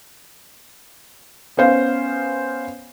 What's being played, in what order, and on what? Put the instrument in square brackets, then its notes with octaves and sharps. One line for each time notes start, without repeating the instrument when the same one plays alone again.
[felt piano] B3 C#4 C5 F5